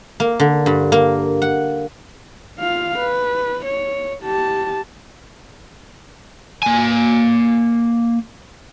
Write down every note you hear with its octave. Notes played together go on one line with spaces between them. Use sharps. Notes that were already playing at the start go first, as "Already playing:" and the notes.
A#3
D3
G2
A#3
F#5
F4 F5
B4
C#5
G4 A5
A#3 G#5